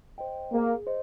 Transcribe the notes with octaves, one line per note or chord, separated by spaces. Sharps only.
C5 D#5 G5
A#3 G#4
C5 D#5